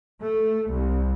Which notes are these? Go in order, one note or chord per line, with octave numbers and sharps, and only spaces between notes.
A3
C2